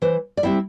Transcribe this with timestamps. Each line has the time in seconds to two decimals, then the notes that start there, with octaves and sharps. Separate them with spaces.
0.02 E3 C5
0.37 D5
0.43 G3 C4 E4 E5